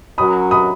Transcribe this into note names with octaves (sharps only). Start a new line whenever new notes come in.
F#3 C#4 F#4 A#4 B5 D#6
B5 D#6